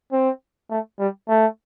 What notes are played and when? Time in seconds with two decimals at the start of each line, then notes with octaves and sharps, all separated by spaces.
0.12 C4
0.70 A3
0.99 G3
1.29 A3